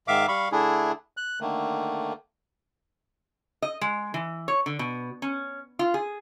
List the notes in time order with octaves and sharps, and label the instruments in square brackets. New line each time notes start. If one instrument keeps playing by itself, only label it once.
[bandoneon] G#2 D#3 E5 F5 D6
G3 F5 B5 C#6
D3 A3 D4 E4 G#4
F#6
D3 D#3 A3 A#3
[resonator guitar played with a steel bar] D#5
G#3
E3
C#5
D3
B2
C#4
F4
G#4